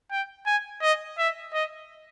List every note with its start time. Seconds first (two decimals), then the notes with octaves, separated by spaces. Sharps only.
0.11 G5
0.46 G#5
0.82 D#5
1.18 E5
1.54 D#5